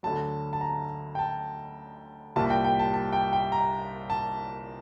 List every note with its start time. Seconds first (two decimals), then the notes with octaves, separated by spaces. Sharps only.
0.03 D2 D3 F#3 A5
0.53 A5
0.61 A#5
1.15 G5
1.19 A5
2.36 C2 A#2 G3 A5
2.50 G5
2.64 G5
2.79 A5
2.94 A5
3.12 G5
3.33 G5
3.52 A#5
4.10 A5